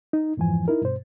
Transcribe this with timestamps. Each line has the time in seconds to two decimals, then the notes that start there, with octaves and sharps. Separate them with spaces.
0.13 D#4
0.37 F2 G#2 E3 F3 G#5
0.68 D#4 E4 A#4
0.82 G2 B2 C5